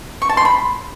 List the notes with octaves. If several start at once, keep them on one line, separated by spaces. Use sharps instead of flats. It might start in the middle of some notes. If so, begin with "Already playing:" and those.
C#6
A5
C6
B5